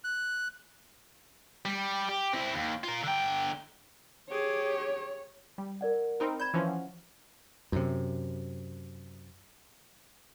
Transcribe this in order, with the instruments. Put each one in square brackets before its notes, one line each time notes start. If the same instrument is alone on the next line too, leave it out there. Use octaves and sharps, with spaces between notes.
[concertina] F#6
[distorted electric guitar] G3
G4
C4 E4
D#2
F4 A#4
D3 G5
[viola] G4 G#4 [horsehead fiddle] C#5
[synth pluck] G3
[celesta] A#4 D5 F#5
[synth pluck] C4 D#4 A#4 [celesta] B5
[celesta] D5 B5 G#6 [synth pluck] G6 E7
[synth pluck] E3 F3 C#4
[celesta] F#5
[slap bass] F#2 C3